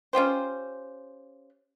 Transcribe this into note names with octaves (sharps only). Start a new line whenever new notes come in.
C#4 F4 G4 C5